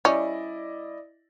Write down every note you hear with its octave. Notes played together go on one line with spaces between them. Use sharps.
G3 C#4 E4 D5 D#5